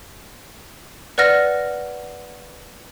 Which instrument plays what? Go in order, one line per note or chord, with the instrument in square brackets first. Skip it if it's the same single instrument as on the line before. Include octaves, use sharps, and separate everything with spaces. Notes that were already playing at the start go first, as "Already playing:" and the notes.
[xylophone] B4 D5 F#5 F6 A#6